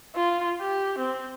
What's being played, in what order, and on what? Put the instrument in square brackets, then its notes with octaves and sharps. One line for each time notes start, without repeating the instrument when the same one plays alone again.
[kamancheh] F4
G4
C4